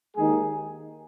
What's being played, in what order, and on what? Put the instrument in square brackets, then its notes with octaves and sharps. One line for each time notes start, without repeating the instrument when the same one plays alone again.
[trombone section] D#2 D#3 G#3 D#4 G#4